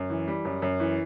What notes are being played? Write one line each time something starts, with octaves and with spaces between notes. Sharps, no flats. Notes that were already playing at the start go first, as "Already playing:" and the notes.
Already playing: F#2
E3
G3
F#2
F#2
E3